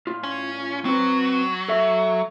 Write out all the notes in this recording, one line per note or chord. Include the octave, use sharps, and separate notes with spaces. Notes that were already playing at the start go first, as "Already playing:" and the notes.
A2 F4
C#4
F#3 C4 B4
A4 E5